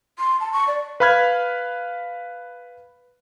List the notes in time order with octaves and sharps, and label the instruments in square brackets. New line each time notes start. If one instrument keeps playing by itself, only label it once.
[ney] C6
A5
C#6
D5
[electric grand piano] B4 F5 B5 F6 G#6